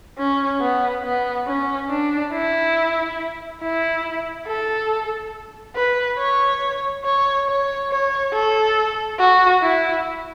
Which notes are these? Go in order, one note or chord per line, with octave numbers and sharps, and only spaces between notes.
C#4
B3
B3
C#4
D4
E4
E4
A4
B4
C#5
C#5
C#5
C#5
A4
F#4
E4